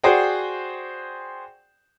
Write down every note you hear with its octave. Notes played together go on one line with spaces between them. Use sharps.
F#4 G#4 C5 D5 F#5 G5